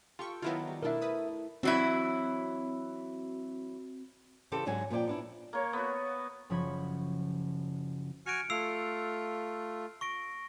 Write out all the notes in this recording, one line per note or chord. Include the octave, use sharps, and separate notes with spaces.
F4 G4 A4 G5 C#6
D#3 F#3 B3 E4 F4
G3
B2 A3 D4 E4 A#4 E5 A5
B4 D#6
E3 F#3 C4 E4 F#4
C#3 E3 G4 A4 C5
G#2 D3 F#3 F#4 G#5
A#2 F3 C5 D5 G5
B3 D4 E4
A#3 C#5
B3 F#4
F#1 C#3 F3 C#5 B5 G#6
F#4 G#5 F6 C#7 D7
A3 F4 E6 C7 F7
C#6 A#6 D7